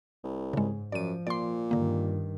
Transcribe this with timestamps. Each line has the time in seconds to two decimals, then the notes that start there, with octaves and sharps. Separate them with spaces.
0.24 C2
0.53 G#2 C#3 G#3
0.92 F#2 F3 D5 D#7
1.27 A#2 D5 C6
1.71 G2 D3 D#3 A#3